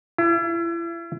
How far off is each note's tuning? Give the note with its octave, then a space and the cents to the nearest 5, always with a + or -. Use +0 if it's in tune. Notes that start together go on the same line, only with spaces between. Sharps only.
E4 +35